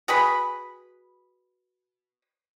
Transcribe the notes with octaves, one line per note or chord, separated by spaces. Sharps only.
F#4 G#4 B4 B5